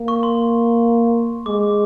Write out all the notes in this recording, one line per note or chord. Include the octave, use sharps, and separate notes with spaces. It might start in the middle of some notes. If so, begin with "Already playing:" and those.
Already playing: A#3
C#6
C6
G#3 D6